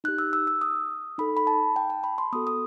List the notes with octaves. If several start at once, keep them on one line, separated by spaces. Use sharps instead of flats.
D#4 G4 F#6
E6
E6
E6
D#6
D#4 A4 B5
B5
A5
G5
A5
B5
C6
B3 F#4 A4 D#6
D#6